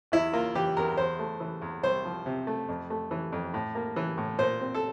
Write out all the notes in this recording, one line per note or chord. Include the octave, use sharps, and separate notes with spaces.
E2 E4
A#3 F4
E3 G4
E2 A#4
E2 C5
A3
E3
E2
C2 C5
F3
C3
A3
F2
A3
E3
F2
A2
A#3
E3
A2
A#2 C5
C4
A4